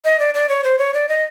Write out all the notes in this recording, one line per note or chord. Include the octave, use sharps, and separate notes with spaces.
D#5
D5
D5
C#5
C5
C#5
D5
D#5